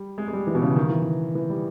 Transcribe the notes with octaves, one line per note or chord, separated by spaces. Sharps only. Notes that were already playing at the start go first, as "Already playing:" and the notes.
Already playing: G3
G#3
G#3
G3
E3
B2
C#3
D#3
E3
D#3
E3
G3